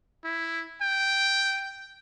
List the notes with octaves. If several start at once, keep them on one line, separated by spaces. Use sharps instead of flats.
E4
G5